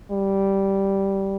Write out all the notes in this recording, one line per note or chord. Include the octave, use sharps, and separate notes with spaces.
G3